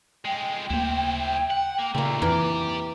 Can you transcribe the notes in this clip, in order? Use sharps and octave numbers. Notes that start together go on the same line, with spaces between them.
F2 G#3 G5
D2 A#3 E4 C5
F#5
A#3
D#2 A#2 C#3 A3 A#3
F2 E3 G4 A#4 D5